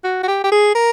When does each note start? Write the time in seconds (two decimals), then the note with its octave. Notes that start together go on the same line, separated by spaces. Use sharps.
0.04 F#4
0.23 F#4
0.28 G4
0.44 G4
0.52 G#4
0.75 A#4